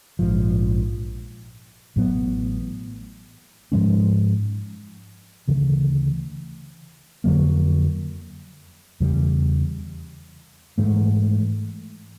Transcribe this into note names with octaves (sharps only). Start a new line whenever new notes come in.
A#1 G#2 F3
A1 A2 F#3 B3
G#2 F3 G#3 C#4
D2 C#3 E3
F2 D3 F#3 A#3
E2 C#3 E3 G3
G#2 E3 A3